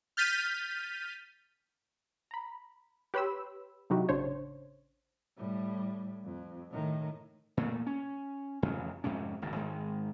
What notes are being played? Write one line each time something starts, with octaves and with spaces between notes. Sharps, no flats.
F6 G6 A6 B6 D#7
A#5 B5
G4 B4 C#5 B5 C6 E6
C3 F#3 D#4 E4 F#4 G4
A1 C#3 D4 C5 C#5
A2 G3
F2
A2 D#3
A#2 A3
C#4
A1 F2 C#3
F2 G#2 C3 C#4
G#1 C#2 G#2
G#2 D#3 G#3